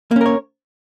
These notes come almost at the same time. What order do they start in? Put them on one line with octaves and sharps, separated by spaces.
A#3 C#4 A#4 C#5